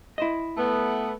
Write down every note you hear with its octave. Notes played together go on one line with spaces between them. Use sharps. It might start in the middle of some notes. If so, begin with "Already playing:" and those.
E4 C5 D#5
A3 B3